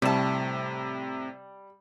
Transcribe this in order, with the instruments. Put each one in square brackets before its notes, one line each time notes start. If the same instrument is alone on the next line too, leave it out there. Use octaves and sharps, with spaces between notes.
[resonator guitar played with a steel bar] A2 A5 [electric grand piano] C3 [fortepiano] G3